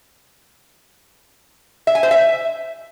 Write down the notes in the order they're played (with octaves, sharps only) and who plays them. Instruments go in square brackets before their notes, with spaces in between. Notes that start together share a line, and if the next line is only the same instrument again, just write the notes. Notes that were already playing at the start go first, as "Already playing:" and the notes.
[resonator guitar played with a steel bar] E5
G#5
C5
E5